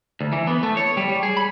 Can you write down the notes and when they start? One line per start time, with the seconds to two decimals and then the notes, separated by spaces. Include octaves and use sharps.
0.21 D2
0.33 E3
0.47 B3
0.63 A3
0.77 C#5
0.97 G3
1.09 G3
1.23 G#4
1.37 B5